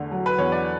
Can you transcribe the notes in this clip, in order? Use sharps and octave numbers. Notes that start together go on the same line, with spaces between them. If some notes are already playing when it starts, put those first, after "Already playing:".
Already playing: E2 D3 A3
F#3
B4
E2 C#5
D5